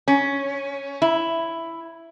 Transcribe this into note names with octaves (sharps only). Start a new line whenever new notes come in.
C#4
E4